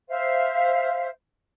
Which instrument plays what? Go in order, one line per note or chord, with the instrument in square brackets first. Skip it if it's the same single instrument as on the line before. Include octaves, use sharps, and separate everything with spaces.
[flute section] C5 E5 F5